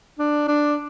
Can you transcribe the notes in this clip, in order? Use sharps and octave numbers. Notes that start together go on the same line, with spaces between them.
D4
D4